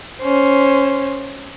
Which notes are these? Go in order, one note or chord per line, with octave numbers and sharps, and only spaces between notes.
C#4 C5